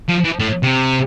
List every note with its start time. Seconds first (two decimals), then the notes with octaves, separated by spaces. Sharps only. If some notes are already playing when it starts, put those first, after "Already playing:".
0.08 F3
0.24 E3
0.39 A2
0.63 C3